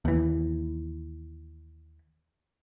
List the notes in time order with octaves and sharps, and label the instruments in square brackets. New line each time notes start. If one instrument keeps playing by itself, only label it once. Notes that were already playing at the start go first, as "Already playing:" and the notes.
[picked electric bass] D#2 E3